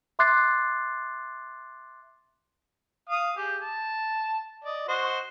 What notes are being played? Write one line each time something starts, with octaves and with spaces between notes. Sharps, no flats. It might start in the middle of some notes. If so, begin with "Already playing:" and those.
E5 C6 D6 F#6 A6 C7
F5 D#6
G4 G#4
A5
D5 D#5
F#4 C5 D#5